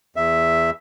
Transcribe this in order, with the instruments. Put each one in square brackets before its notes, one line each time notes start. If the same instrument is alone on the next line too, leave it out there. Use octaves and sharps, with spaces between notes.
[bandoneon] E2 E5